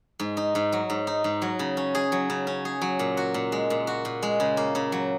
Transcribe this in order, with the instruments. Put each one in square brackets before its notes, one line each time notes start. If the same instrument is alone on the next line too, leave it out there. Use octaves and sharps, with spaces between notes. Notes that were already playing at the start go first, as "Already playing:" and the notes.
[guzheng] G#2
D#4
G#2
F#3
G#2
D#4
G#2
F#3
C#3
C#4
G#4
F#3
C#3
C#4
G#4
F#3
A#2
F#4
A#2
G#3
A#2
F#4
A#2
G#3
C#3
A#3
C#3
F#3